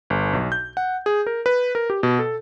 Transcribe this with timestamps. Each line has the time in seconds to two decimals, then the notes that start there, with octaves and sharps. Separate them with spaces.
0.10 G1
0.33 B1
0.52 G6
0.77 F#5
1.06 G#4
1.27 A#4
1.46 B4
1.75 A#4
1.90 G4
2.03 B2
2.19 A4